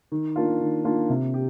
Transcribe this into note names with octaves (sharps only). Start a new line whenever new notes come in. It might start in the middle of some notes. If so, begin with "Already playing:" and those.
D#3
A#3 D4 F4
D#3
A#3 D4 F4
C3
G4